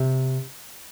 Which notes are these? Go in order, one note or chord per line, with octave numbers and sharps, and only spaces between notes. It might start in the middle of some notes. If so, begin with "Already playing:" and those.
Already playing: C3